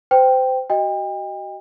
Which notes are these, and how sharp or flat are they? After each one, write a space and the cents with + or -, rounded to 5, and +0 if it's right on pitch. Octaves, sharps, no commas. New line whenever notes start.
C5 -30 G5 +0
F#4 +30 D#5 +5 G5 +35